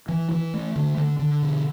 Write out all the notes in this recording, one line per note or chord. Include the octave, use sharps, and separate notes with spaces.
E3
E3
A3
D3
D3
D3
B2